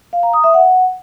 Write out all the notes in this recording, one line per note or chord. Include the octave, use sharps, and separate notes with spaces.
F5
A#5
D#6
E5
F#5